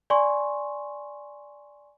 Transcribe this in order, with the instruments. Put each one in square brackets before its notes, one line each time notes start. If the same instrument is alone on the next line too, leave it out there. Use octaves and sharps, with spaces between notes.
[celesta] D5 G#5 C6 C#6